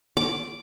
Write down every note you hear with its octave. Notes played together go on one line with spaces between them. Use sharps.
D6